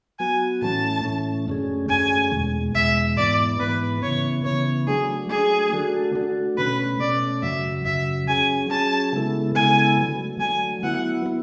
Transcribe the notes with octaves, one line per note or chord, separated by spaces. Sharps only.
F#3 B3 F#4 G#5
A2 E3 A3 C#4 A5
A2 E3 A3 C#4
F#2 D3 A3 C#4 G#4
F#2 D3 A3 C#4 G#4 G#5
E2 B2 G#3
E2 B2 G#3 E5
G#2 E3 B3 D5
G#2 E3 B3 B4
C#3 E3 B3 C#5
C#3 E3 B3 C#5
F#3 A3 D4 G#4
F#3 A3 D4 G#4
D3 A3 D4 F#4 A4
D3 A3 D4 F#4 A4
B2 A3 C#4 B4
B2 A3 C#4 D5
F#2 C#3 F#3 E5
F#2 C#3 F#3 E5
F#3 C#4 G#4 G#5
F#3 C#4 G#4 A5
C#3 G#3 B3 E4 A4
C#3 G#3 B3 E4 A4 G#5
D3 F#3 A3
D3 F#3 A3 G#5
F#3 B3 E4 F#5
F#3 B3 E4